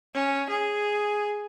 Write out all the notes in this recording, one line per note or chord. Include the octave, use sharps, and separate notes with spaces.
C#4
G#4